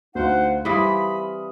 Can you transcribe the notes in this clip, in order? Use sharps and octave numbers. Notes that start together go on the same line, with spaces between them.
D2 D#4 C5 F5 F#5
E3 G3 C4 F5 B5 D#6